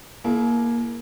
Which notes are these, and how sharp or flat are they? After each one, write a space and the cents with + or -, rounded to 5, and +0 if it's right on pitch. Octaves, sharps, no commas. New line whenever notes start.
A#3 +10 E4 +15 G#4 +45